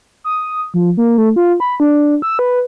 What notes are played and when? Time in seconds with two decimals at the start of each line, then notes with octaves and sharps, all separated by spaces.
0.24 D#6
0.74 F3
0.97 A#3
1.18 A3
1.36 F4
1.60 B5
1.80 D4
2.22 E6
2.39 B4